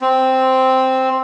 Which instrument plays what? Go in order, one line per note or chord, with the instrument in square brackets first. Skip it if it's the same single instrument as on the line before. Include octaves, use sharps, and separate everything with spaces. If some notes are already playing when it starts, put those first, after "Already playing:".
[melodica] C4